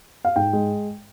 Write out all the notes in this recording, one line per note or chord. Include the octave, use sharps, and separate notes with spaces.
F5
G#2 G5
G#3